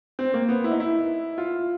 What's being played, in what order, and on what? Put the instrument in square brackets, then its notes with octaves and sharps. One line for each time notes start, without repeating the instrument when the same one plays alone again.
[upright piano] C4
A#3
B3
E4
D#4
E4
F4